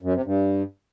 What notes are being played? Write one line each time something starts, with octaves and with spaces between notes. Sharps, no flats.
F#2
C3
G2